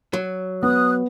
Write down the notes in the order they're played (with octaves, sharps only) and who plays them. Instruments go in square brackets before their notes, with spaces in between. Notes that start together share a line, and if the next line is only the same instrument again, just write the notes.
[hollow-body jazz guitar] F#3
[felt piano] B3 [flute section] D#6 F#6